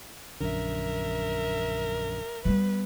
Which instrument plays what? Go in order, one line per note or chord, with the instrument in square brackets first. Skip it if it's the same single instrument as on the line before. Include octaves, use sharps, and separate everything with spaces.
[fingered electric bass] A#1 F#2 D3 [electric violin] A#4 E5
[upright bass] G3 B3 [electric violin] B4